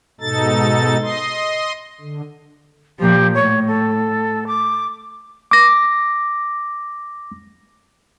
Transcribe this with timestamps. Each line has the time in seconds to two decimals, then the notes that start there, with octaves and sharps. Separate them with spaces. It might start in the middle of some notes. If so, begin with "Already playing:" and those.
0.21 G#2 B2 D#4 A4 A6
1.02 D#5 C6
2.01 D3
3.00 A#2 F3 G4
3.34 A2 C#5
3.67 A4
4.47 D6
5.51 D6 A#6